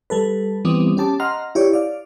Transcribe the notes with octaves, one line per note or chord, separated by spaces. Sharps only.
G3 A4 B4
E3 G3 B3 C4 D6 D#6
C#4 G4 A5 D6
D#5 F#5 A#5 C6 F6
E4 G4 C#5 D5
D5 F5